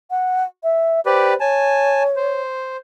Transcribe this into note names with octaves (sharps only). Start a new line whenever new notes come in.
F#5
E5
G4 B4 C5 D5
C#5 G#5 A5
C5